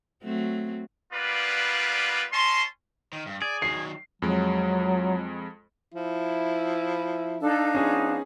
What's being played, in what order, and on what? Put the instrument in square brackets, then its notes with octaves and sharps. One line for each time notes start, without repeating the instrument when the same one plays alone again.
[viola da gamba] F#3 A3 C4
[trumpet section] G3 A#3 B3 F4 B4 D5
C#4 D#5 A5 C6
[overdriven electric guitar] D#3
G2
[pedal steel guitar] G#4 [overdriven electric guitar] D5
[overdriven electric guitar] D#3 F#3 [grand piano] C7
[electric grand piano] F2 G#3 [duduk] F#3
[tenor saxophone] F3 [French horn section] E4
[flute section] D4 D#4 F5 [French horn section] A4
[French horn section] F3 B3 [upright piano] C#4 G#4